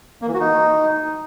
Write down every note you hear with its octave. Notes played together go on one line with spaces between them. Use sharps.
A#3
E3
F#4
D#4